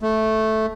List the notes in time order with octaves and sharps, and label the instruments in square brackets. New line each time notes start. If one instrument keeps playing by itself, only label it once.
[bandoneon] A3